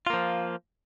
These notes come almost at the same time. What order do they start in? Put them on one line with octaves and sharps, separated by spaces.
F4 A#3 F3